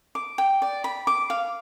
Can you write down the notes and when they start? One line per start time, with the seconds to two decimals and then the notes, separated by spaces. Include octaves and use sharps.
0.15 D6
0.38 G5
0.62 D5
0.84 B5
1.07 D6
1.30 F5